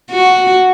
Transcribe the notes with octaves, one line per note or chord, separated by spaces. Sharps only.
F#4